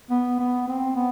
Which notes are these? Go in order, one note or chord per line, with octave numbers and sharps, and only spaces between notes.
B3
B3
C4
B3